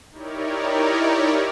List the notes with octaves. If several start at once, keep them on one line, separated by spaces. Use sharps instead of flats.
D#4 E4 G4 A#4 C#5 D5